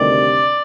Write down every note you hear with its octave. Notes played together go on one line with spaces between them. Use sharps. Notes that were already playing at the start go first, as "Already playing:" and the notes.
Already playing: D2 C3 D#3 G3 D4 D5